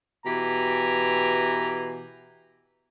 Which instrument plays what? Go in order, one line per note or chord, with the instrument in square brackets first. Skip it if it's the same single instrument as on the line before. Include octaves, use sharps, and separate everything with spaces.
[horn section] B2 E3 G4 G#5 A#5